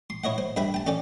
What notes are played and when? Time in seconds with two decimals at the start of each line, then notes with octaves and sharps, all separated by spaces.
0.10 C6
0.24 E4 C#5 D#5 F#5
0.38 C5
0.56 G2 B4 E5 G5 B5
0.74 G5 A5
0.87 C#4 A4 D5 G5